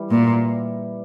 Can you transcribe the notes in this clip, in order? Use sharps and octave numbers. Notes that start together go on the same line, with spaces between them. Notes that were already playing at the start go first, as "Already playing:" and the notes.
Already playing: E3 G3
A#2